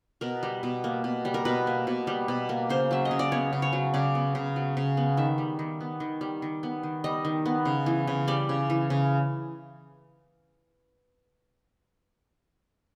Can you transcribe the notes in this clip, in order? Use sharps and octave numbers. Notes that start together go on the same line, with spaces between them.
B2 A#4
G3
B2
A#3
B2
G3
A#4
B2 B4
A#3
B2
G3
B2
A#3
C#3 C5
F#3 E5
D#5
C#3
D5
B3 C#5
C#3
C#5
F#3
C#3 D5
B3
C#3
F#3
C#3
B3
D#3 E5
G3
D#3
B3
D#3
G3
D#3
B3
D#3
G3 D#5
D#3
B3
C#3
E3
C#3
G3 D5
C#3
E3
C#3